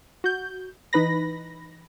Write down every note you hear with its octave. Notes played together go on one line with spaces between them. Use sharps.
F#4 G6
E3 D#4 B4 B5 A#6